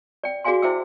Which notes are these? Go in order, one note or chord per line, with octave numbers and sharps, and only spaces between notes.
D5 G5
F#4 G#4 D5 F5 G#5 C6
E4 C5 E5 G5 D6 E6